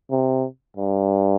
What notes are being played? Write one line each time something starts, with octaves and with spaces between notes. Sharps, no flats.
C3
G2